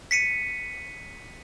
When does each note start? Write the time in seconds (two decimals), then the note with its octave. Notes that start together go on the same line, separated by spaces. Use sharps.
0.11 B6 C#7 D#7